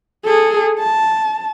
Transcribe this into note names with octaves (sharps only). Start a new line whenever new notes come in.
G#4 A4
A5